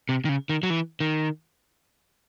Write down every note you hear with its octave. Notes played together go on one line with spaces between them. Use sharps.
C3
D#3
C#3
D#3
F#3
E3
D#3